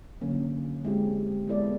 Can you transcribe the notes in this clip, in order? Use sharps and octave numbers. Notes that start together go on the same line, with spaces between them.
D3 F#3 A#3 C#4
G#3 C4 E4 G4
G#3 B3 E4 A4 D5